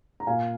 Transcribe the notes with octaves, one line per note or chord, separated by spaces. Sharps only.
A#5
A#2 F5 G#5